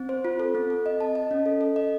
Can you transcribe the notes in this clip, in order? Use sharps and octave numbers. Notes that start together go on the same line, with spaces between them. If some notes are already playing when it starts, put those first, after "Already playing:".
Already playing: C4
C5
F4
A4
C4
A4
D#5
A5
D#5
C#4
A4
A4
D#5